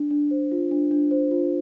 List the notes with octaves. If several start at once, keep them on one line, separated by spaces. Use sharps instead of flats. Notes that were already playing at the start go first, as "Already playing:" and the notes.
Already playing: D4
D4
C5
F4
D4
D4
C5
F4